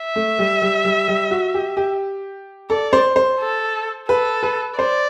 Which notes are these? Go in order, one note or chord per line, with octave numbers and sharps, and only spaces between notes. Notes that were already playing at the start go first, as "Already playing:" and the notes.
Already playing: E5
A3
G3
G3
G3
G3
F#4
G4
G4
A4 D5
C5
C5
A4
A4 B4
B4
C5 D5